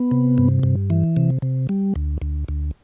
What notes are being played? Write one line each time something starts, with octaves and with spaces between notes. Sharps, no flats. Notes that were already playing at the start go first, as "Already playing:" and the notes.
Already playing: B3
C3
G2
G2
E3
C3
C3
G3
D2
D2
D2